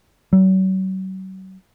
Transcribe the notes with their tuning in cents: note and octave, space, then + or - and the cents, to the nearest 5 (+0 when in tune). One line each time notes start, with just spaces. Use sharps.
F#3 +40